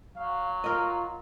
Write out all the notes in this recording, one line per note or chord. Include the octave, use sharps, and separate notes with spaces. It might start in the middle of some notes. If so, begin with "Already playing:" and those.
F#3 F5
F4 A#4 D#5